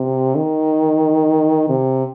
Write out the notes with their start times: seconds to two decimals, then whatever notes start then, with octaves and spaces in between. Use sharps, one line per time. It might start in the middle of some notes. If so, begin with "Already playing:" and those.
Already playing: C3
0.35 D#3
1.69 C3